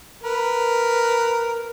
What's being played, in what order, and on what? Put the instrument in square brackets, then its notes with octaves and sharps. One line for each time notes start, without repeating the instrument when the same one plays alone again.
[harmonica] A#4 B4